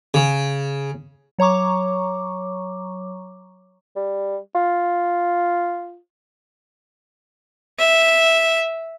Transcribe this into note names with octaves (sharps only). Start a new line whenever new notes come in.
C#3
F#3 C#5 A#5 C#6 D6
G3
F4
E5